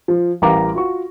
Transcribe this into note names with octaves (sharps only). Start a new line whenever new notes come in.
F3
A1 G3 A#4 F5 A#5 D6
F4 F#4 C#6